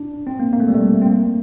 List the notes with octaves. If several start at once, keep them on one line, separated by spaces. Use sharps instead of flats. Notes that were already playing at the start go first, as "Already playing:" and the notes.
Already playing: D4
C4
A#3
A#3
A3
G3
A3
C4
A#3